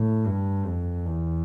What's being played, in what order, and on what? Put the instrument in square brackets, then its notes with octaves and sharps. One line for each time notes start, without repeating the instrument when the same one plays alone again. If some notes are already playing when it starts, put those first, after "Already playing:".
Already playing: [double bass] A2
G2
F2
E2